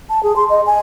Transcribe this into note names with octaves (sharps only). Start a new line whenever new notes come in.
A5
G#4
C6
D#5
G#5